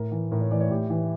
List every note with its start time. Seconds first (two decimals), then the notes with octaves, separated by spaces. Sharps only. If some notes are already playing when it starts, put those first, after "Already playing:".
Already playing: A2 A#4
0.12 E3
0.32 A2 A#4
0.41 C#5
0.51 E3 D5
0.60 C#5
0.70 A2 G4
0.90 E3